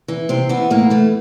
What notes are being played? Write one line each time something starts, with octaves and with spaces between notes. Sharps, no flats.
E3
C3 C4
E3 B3
A2 A#3
E3 A3